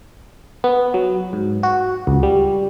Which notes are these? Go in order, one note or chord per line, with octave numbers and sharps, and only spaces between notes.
B3
F#3
G#2
F#4
C#2
G3